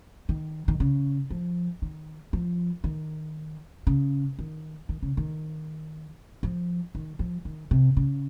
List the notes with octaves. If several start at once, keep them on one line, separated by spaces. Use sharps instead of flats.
D#3
D#3
C#3
F3
D#3
F3
D#3
C#3
D#3
D#3
C#3
D#3
F3
D#3
F3
D#3
C3
C#3